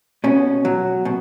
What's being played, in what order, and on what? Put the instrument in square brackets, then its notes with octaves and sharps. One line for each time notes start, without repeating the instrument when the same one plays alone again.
[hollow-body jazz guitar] B2 C#4
F#3
B2